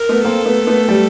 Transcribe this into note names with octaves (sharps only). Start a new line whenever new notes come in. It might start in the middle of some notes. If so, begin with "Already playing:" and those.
Already playing: A#4
A3 B3
A#3 C4 A4
A3 B3
A3 B3
G3 A3